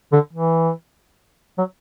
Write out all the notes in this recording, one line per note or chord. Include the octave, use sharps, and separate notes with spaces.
D3
E3
F#3